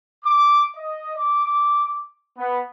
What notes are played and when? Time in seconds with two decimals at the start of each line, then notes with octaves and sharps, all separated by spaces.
0.23 D6
0.76 D#5
1.17 D6
2.38 B3